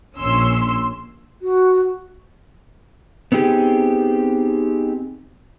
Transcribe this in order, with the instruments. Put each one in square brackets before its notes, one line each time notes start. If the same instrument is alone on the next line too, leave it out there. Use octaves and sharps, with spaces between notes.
[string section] A#1 C#4 C6 E6
[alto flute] F#4
[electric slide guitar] B3 C4 D#4 G4 G#4